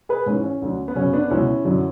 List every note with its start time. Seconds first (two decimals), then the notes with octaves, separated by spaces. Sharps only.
0.09 G#4 B4
0.26 G#2 E3 C#4
0.44 C#4
0.62 D2 D3 F#3
0.88 B3
0.95 F#2 C#3 F#3 C#4
1.13 B3 D4
1.30 C#2 B2 F#3 C#4 E4
1.64 F#2 D3 F#3